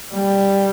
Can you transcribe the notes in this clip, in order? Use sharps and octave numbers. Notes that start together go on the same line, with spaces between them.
G3